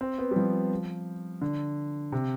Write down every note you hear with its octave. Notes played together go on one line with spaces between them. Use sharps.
C4
B3
G3
F3
D3
C3